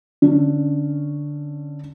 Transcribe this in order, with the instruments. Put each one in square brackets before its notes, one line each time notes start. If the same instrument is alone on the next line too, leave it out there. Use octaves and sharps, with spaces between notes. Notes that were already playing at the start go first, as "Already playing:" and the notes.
[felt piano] D3 C#4